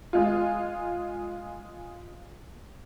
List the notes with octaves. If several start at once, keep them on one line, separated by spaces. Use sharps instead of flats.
G#3 F4